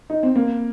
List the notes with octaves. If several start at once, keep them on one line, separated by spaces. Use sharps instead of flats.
D#4
C4
A#3